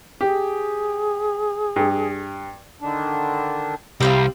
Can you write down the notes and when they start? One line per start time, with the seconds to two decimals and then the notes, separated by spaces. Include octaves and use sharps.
0.21 G4 G#4
1.76 G2
2.81 D3 D#3 D4
4.00 C2 G3 C4 F5